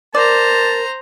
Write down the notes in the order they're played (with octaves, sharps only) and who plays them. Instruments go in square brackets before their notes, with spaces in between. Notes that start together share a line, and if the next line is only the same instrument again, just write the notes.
[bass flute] A#4 [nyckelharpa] C5 A#5 [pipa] D5 [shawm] A5